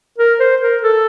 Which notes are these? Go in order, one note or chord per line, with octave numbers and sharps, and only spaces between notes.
A#4
C5
A#4
A4